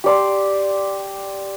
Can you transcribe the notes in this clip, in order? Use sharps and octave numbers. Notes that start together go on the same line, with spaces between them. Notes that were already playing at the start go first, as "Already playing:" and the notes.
G4 D5 C6